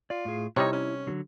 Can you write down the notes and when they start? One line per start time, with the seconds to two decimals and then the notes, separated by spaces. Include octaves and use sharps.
0.10 F4 D5
0.25 A2 G#4
0.56 C3 G3 D#4 E4 C#5
0.73 C#4
1.07 D3 F#3